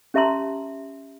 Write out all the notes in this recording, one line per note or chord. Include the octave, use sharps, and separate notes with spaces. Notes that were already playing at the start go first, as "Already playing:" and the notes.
C#4 G4 E5 A5 A#5 C6